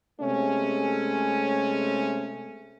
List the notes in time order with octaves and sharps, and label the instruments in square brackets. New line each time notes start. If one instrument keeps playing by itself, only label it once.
[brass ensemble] C3 G#3 A3 C#4